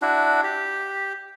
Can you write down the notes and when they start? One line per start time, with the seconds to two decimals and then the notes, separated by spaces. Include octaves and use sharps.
0.02 D4 E4 F#4
0.44 G4